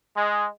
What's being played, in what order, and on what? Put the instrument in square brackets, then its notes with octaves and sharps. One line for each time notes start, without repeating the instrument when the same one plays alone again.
[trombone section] G#3